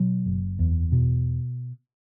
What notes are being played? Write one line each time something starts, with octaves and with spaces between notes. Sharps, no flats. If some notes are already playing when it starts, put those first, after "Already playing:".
Already playing: B2 F#3
F#1
E2
B2